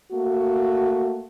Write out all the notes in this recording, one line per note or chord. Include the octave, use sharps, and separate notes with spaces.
A3 A#3 F#4